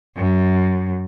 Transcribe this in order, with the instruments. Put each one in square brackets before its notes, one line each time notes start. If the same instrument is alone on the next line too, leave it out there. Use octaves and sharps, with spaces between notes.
[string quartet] F#2